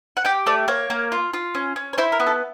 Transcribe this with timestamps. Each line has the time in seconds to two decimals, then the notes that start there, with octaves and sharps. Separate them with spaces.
0.17 F#5
0.25 G4 G5
0.46 A3 D5
0.68 A#3 C#5
0.90 A#3
1.12 F4
1.34 F4
1.55 C#4
1.76 C#4
1.93 C#5
1.98 E4 C5
2.12 A#4
2.20 B3
2.27 A4